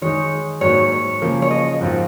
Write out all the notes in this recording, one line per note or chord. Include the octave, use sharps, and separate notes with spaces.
D#3 G#3 D#4 C#5
G#2 F#3 A#3 C#5
C#5
C#3 F3 A#3
C#5
D#5
G#2 F3 C4 F4